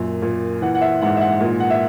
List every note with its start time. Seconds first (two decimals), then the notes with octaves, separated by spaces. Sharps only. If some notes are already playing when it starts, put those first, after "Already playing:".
Already playing: F#2 A#2
0.22 A#2
0.62 E3 F#5
0.75 F#5
0.81 E5
1.02 G#2 F#5
1.17 E5
1.21 F#5
1.41 A#2
1.60 F#5
1.70 E5